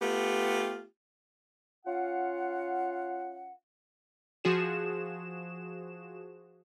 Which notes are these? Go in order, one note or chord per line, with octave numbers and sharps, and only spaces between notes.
A3 B3 F4 G4
C#4 F4 F5 F#5
F3 F#4 G#4 E7